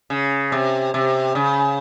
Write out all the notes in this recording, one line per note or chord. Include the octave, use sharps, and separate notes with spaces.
C#3
C3
C3
C#3